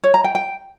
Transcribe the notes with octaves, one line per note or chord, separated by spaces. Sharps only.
C#5
A#5
G5
G5